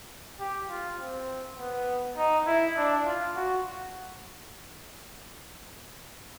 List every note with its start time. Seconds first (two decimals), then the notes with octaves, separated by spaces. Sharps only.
0.40 G4
0.69 F4
0.99 C4
1.58 B3
2.17 D#4
2.47 E4
2.77 D4
3.06 F4
3.36 F#4